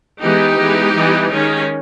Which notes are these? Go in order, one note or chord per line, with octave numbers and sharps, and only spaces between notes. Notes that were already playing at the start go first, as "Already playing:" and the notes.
E3 G#3 B3 D#4 G4
E3 G#3 B3
E3 G3 B3
D#3 G#3 C#4